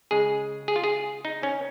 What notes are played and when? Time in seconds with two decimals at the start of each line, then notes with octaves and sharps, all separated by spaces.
0.11 C#3 G#3 G#4
0.68 G#4
0.76 F4
0.84 G#4
1.25 D#4
1.43 C#4